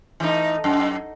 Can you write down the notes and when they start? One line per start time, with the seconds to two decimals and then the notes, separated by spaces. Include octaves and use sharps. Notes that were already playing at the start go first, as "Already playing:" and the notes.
0.20 E3 A3 D#4
0.64 F#2